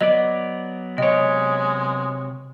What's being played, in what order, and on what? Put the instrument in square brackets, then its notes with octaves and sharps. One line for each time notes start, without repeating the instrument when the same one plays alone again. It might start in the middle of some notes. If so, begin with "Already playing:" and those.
[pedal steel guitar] F#3 B3 D5 [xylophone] D#5
[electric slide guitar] C3 C#5 [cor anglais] G#3 [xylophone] D#5